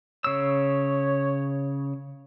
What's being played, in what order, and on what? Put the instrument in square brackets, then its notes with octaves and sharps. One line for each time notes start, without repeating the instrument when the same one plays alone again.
[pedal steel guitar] C#3 E6 [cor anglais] C#5